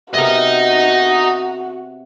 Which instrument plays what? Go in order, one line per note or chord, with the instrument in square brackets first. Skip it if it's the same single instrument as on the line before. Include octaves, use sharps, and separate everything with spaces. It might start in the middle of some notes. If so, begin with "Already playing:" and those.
[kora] C3 B3 A#4 [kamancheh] F#4 [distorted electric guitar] D#5 A#5